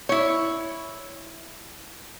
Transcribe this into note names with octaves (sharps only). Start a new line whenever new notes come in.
E4 C#5